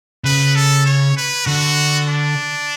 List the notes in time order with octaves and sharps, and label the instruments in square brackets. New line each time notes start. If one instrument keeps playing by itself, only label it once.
[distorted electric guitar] C#3 [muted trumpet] B4
[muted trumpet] A4
C#5
B4
[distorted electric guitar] D3 [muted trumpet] F#4
[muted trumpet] D4